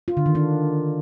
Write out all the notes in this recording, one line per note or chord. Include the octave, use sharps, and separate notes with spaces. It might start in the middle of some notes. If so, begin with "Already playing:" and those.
F4
D3
D#3
D4